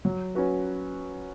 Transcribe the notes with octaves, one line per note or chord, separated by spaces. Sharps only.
F#3
C#4 F#4 B4